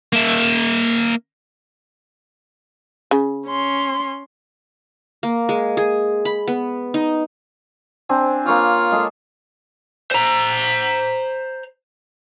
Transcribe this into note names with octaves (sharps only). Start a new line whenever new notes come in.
A#3 E5
C#3
C#4 C6
A#3
G#3
G#4
B5
B3
D#4
C4 D4 G#5
A#3 F4 C#5 D6
G#3 G#4 A4
C5 A#5